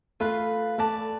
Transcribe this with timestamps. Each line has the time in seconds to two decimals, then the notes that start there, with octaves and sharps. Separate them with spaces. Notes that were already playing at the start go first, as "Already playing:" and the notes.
0.20 A3 F4 B4 F5
0.78 A3 B4 D5 A5